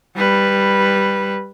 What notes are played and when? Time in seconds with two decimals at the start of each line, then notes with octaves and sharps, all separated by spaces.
0.16 G3 B4